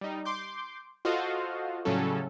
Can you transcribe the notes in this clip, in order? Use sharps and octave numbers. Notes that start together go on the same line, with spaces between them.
G3 D#4
C6 D6 G6
F4 F#4 A4 C5 D#5 F5
A2 C#3 F#3 G3 C#4 A4